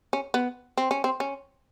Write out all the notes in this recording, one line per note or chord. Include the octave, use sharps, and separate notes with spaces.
C#4
B3
C4
C#4
C4
C#4